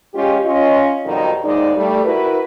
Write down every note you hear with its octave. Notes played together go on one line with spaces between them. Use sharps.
G#3 C#4 F4 G4
C#4 F4 D#5
F2 B2 D#3 F#3 G3 D#4
D#2 G#2 G#3 D#4 D5
G3 A3
E4 F#4 A#4 B4